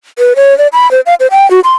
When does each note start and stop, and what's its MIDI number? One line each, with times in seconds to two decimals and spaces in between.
0.19 0.33 71
0.36 0.57 73
0.58 0.67 74
0.73 0.90 83
0.91 1.00 72
1.06 1.15 77
1.20 1.27 72
1.31 1.49 79
1.51 1.60 66
1.64 1.75 84